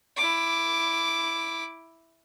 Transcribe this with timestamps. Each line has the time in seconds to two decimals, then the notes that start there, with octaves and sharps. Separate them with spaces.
0.17 E4 D6